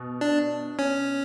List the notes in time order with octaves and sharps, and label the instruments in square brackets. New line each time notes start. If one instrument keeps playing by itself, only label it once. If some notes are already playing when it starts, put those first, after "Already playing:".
Already playing: [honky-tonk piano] B2
[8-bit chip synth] D4
C#4